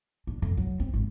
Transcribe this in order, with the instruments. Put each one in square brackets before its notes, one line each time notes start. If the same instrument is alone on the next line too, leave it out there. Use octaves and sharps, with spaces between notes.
[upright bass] D4
F2
F#3
C4
G#1